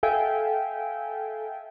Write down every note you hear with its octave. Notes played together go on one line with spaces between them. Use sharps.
A4 E5 F5 G5 G#5